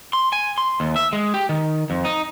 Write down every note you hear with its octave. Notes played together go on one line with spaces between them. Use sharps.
C6
G#5
C6
D#2
E5
G#3
G4
D#3
F2
D#4